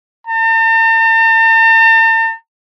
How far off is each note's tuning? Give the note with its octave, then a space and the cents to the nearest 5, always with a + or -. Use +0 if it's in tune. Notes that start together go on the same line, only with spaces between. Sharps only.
A5 +45